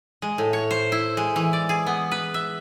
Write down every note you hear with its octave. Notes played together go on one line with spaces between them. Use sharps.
G#3
A2
C#5
C5
E4
G#3
E3
D5
G#4
B3
B4
E5